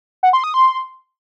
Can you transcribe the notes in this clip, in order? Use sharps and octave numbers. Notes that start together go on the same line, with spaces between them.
F#5
C6
D#6
C6